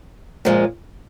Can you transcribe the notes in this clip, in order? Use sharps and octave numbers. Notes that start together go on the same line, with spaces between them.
A#2 F3 G#3